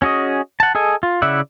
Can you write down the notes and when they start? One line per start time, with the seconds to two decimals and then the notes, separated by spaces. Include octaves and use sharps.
0.02 C#4 F#4 G#4 D#5
0.60 F#5 A5
0.75 G#4 A4 D#5 G#5
1.03 F4
1.22 C#3 E4 D5 E5 F#5